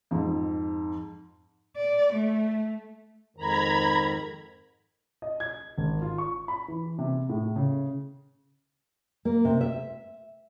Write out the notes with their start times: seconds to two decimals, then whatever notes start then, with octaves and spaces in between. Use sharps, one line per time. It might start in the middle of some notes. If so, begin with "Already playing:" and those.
0.11 F2 G#2
1.77 D5
2.13 A3
3.36 F2 G#2 D#3 A#5 B5 G#6
5.22 D#5
5.40 G#6
5.78 G#1
6.02 F4
6.18 C#6
6.48 B5
6.68 E3
6.99 C3
7.29 A2
7.56 C#3
9.25 A#3
9.45 C3
9.61 E5